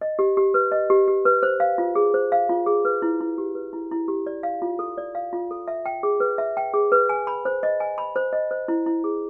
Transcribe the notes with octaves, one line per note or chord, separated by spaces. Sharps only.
D#5
G4
G4
B4
D#5
G4
G4
B4
C5
F5
F4
G#4
C5
F5
F4
G#4
B4
E4
E4
G4
B4
E4
E4
G4
D5
F5
F4
A4
D5
F5
F4
A4
E5
G5
G#4
B4
E5
G5
G#4
B4
G#5
B5
C5
D#5
G#5
B5
C5
D#5
C5
E4
E4
G#4